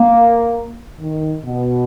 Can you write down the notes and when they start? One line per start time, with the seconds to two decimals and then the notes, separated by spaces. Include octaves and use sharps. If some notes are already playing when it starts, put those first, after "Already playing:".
Already playing: A#3
0.99 D#3
1.44 B2